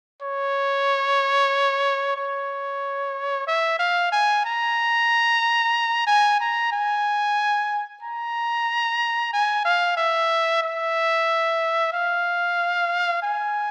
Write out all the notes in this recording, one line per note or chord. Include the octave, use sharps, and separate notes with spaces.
C#5
C#5
E5
F5
G#5
A#5
G#5
A#5
G#5
A#5
G#5
F5
E5
E5
F5
G#5